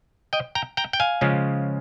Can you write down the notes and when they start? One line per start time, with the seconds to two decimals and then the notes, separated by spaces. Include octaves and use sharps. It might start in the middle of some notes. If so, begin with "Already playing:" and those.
0.33 D#5 G5
0.55 G5 A#5
0.77 G5 A#5
0.93 G5
1.00 F5 G#5
1.21 C#3 F3 G#3 C#4 F4